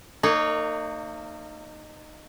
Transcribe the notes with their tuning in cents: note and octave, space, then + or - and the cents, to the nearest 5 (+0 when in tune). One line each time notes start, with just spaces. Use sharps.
A#3 -40 D#4 -20 C#5 +10